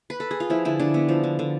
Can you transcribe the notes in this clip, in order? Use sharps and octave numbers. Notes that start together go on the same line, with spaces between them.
B4
A4
G#4
F4
F3 E4
D3 E4
D3 D4
B3
F3
D3
D3